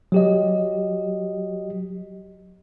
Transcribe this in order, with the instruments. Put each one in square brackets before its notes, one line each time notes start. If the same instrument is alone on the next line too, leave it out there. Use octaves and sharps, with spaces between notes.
[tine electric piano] F#3 G4 D#5